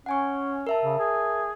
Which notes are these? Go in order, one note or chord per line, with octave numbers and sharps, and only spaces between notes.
C#4 F#5 G#5 C#6
A#4 E5 A5
C#3
G#4